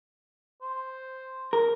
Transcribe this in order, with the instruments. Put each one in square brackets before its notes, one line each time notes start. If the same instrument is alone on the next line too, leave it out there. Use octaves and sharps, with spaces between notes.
[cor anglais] C5
[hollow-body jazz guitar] A#4